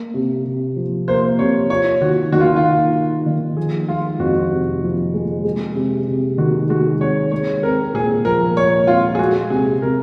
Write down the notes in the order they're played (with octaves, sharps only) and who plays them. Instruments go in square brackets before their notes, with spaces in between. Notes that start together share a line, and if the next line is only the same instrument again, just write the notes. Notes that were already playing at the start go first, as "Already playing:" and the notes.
Already playing: [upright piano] A#3
C3
C3
F3
[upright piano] A#3 [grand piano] C5
[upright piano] C3 [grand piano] C#5
[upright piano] F4 [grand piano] C#5
[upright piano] D#3 [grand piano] F#4
[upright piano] D#3 [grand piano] F#4
[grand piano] F4
F4
[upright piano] A#3
F4
D#3
[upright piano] F3 [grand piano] G#4
[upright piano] G#3 [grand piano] F4
[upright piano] F2 [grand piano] F#4
[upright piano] C3
F3
G#3
G#3
C3
C3
[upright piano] D#3 [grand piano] F#4
[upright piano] G#3 [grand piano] F#4
[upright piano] C3 [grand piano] C#5
[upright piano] G#3 [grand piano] C#5
[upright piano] C4 [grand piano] A#4
[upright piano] A#2 [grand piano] G#4
[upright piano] F3 [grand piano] A#4
[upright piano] G#3 [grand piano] C#5
[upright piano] C4 [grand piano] F4
[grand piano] G#4
[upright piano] G#3 [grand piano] F#4
[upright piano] C3 [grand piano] G#4
[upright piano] C3 [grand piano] A#4